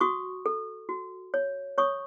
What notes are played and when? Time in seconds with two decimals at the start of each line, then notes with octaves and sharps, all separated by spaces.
0.01 F#4 C#6 D#6
0.46 A4
0.89 F#4
1.34 C#5
1.78 C#5 C#6 D#6